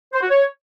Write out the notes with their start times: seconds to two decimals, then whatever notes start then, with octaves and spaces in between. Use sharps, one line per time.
0.13 C5
0.21 F#4
0.29 C#5